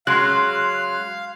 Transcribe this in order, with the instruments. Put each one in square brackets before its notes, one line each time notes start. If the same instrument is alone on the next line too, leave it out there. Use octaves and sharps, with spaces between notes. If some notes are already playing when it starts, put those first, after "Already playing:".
[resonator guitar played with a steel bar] C#3 F#3 G#3 [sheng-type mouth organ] F5 [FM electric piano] C6 F#6